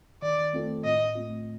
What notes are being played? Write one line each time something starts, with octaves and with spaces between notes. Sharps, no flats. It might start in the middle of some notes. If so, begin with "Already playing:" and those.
D#3 D5
A3 C4 F4 A4
A2 D#5
A3 C4 F4